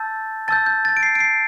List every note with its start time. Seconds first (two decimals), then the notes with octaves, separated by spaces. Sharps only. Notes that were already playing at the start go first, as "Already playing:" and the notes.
Already playing: A5 E6 G6 A6
0.48 A5 E6 G6 A6
0.66 G6
0.85 A6
0.97 D7
1.03 C7
1.15 D7
1.20 C7